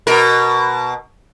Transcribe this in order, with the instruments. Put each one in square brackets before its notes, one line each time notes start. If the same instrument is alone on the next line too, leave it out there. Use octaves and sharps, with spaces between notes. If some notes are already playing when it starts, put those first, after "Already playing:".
[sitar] B2 A#4